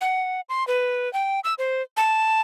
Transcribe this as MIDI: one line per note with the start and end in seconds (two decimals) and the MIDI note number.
0.01 0.41 78
0.49 0.66 84
0.67 1.11 71
1.13 1.40 79
1.44 1.54 88
1.58 1.82 72
1.97 2.41 81